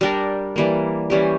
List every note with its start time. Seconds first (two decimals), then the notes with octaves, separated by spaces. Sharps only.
0.01 G3 D4 G4 A#4
0.56 E3 G3 A#3
1.10 E3 G3 C#4 G4